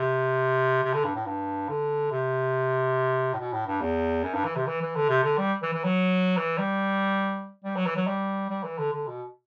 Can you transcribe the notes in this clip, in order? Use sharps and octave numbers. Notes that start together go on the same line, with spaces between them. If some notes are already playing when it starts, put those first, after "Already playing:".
Already playing: C3
C3
D3
G2
A2
G2
D3
C3
A2
B2
A2
G2
E2
F#2
G2
E3
C3
E3
E3
D3
C3
D3
G3
E3
E3
F#3
E3
G3
G3
F#3
E3
F#3
G3
G3
E3
D3
D3
B2